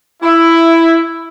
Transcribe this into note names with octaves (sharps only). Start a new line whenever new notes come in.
E4